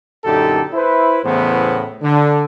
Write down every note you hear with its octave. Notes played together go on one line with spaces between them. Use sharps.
F#2 A#2 D3 D#4 G4 A4
E4 B4 C5
E2 A2 C#3 E3 B3 C5
D3